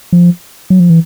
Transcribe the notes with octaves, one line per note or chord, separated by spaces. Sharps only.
F3
F#3
F3
E3